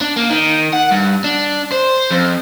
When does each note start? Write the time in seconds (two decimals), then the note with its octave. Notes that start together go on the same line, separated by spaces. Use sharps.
0.01 D4
0.17 A#3
0.30 D#3
0.73 F#5
0.91 G2
1.24 D4
1.72 C5
2.11 F2